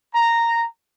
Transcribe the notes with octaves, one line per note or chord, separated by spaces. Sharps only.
A#5